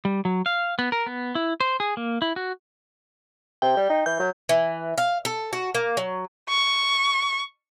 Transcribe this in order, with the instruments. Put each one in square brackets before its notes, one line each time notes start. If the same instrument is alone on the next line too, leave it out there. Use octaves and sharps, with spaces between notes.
[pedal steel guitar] G3
F#3
F5
B3
A#4
B3
E4
C5
G#4
A#3
E4
F#4
[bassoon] C3 [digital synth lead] G5
[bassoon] G3
D#4
[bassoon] E3 [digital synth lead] G6
[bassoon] F#3
[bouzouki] E3
F5
A4
F#4
A#3
F#3
[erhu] C#6